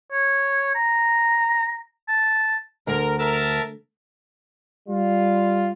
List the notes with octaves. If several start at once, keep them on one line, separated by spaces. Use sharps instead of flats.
C#5
A#5
A5
D2 A#4
A#4 E5 A5
G3 F4